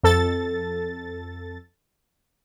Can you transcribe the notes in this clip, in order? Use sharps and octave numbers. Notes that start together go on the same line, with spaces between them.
F2 A4 A6